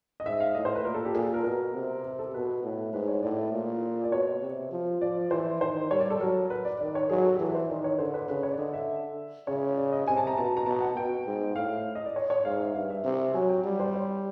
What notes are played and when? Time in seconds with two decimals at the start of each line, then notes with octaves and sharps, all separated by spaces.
0.20 D#5
0.26 G#2 E5
0.40 F5
0.55 A2 D#5
0.65 C5
0.75 B4
0.84 A#2 A#4
0.95 A4
1.05 G4
1.14 A#2 G#4
1.25 A4
1.34 A#4
1.44 B2 A#4
1.74 C3
2.05 A#4
2.19 A4
2.33 B2 B4
2.63 A2
2.93 G#2 B4
3.08 C#5
3.23 A2 D5
3.52 A#2
4.04 D5
4.12 B2 C#5
4.42 C3
4.72 F3
5.01 F3 D5
5.31 E3 C5
5.61 D#3 C5
5.91 G3 C#5
6.00 D5
6.10 A4
6.20 F#3 A#4
6.50 B4
6.65 D5
6.80 D#3 D5
6.95 C#5
7.10 F#3 G#4
7.24 A4
7.35 G4
7.39 E3 G#4
7.48 B4
7.55 C5
7.69 D#3 D5
7.84 C#5
7.99 D3 C5
8.14 B4
8.29 C#3 B4
8.43 C#5
8.52 D5
8.58 D3 D#5
8.73 E5
9.47 C#3 C#5
9.78 D5
9.93 D#5
10.07 C3 G#5
10.17 A5
10.27 A#5
10.37 B2 A5
10.57 A#5
10.66 B2 A5
10.81 F#5
10.96 B2 G5
11.26 G#2
11.56 A2 F5
11.95 D#5
12.06 D5
12.16 C#5
12.30 C#5
12.45 G#2 F5
12.60 E5
12.75 G2 F5
12.90 E5
13.04 C3
13.34 F#3 G#5
13.49 G5
13.64 G3
13.80 C5
13.94 C#5